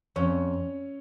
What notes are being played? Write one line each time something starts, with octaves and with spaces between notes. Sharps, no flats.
F2 C#4 C#5